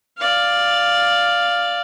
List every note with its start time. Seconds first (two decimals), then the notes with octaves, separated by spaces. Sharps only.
0.18 D5 F5